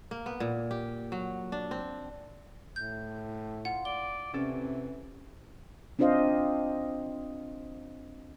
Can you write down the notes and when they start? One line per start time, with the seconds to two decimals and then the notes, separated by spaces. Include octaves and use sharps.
0.11 A#3
0.26 B3
0.40 A#2
0.71 G4
1.12 F#3
1.52 D4
1.71 C4
2.76 A2 G6
3.65 F4 F#5
3.85 D5 G7
4.33 C3 E3 C#4 A4
5.99 C4 D4 F4 C5 D#5 F5